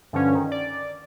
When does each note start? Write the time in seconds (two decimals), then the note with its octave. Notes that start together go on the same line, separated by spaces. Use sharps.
0.13 G2 D3 F3 C#4
0.35 D#3
0.52 D5